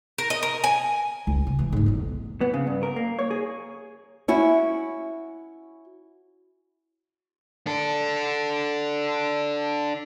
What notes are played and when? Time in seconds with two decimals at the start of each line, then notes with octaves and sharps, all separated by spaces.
0.18 A#4
0.30 D#5
0.43 A#4
0.64 G#5
1.27 C#2
1.47 C3
1.59 C3 E3
1.72 D2 G#2
1.86 B1 E2
2.41 B3
2.54 C#3
2.67 G2
2.83 A#4
2.96 A#3
3.19 C#5
3.31 G#4
4.28 C#4 E4 F#4
7.67 D4 A4